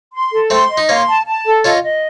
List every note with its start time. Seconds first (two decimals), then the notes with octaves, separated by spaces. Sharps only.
0.13 C6
0.32 A4
0.50 A3 C4 C6
0.70 D#5
0.78 D#4
0.89 A#3 C#4 C6
1.08 A5
1.26 A5
1.46 A4
1.65 C#4 F4 D#5
1.83 D#5